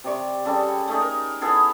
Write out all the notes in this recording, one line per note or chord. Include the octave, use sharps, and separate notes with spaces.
C3 D5 C#6
C#3 G3 A4
A3 D#4 G#4
A#4
B3 E4 G#4 A4